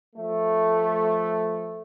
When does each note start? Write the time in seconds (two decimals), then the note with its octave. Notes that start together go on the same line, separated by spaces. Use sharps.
0.16 F3 A3